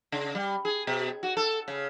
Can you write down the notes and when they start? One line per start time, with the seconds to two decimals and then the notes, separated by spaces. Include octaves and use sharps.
0.12 C#3
0.35 G3
0.65 G#4
0.87 B2
1.23 F#4
1.37 A4
1.68 C#3